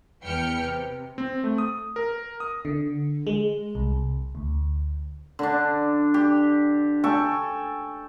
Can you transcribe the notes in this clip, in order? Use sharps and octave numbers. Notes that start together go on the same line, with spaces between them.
E2 B4 G5 F6 C#7
C3
C4
A3
D#6
A#4
D#6
D3
G#3
C2
D2
D3 D4
G4
A4 G5 G#5 C#6